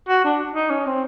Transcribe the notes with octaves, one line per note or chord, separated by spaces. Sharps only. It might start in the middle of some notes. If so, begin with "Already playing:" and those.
F#4
D4
D#4
C#4
C4